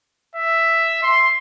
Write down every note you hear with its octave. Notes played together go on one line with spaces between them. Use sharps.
E5
C6